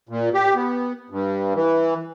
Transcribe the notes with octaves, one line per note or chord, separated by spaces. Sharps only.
A#2
G4
B3
G2
E3